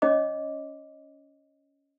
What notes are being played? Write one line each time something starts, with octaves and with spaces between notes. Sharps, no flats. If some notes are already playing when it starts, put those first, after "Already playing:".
C#4 C#5 D#5 D6